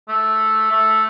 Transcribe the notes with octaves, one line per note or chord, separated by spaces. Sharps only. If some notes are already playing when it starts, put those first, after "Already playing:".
A3
A3